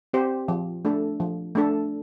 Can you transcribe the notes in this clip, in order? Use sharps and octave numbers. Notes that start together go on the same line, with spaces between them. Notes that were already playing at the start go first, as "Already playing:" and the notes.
C4 G4 C5
F3
A3 D4 A4
F3
A3 D4 A4